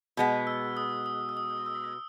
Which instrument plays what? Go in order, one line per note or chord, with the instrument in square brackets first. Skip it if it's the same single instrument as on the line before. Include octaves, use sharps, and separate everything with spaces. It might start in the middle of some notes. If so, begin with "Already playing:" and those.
[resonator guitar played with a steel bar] B2 G#3 B3
[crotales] E6
D#6
D#6
E6
D#6
E6